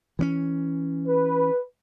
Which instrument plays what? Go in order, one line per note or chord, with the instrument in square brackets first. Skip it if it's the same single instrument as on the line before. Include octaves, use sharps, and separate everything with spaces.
[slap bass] E3 C4 C#4
[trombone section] B4